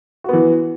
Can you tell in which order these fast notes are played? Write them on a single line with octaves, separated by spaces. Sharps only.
F#4 B3 E3